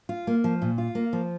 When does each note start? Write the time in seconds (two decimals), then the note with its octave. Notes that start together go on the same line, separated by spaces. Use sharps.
0.09 F4
0.27 A#3
0.44 F3
0.62 A#2
0.78 F4
0.95 A#3
1.13 F3